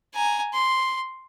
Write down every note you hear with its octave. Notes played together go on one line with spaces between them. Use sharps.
G#5 A#5
C6